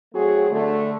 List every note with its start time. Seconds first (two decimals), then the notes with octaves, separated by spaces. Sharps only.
0.13 F#3 A3 C4 F#4 G#4
0.50 D3 A3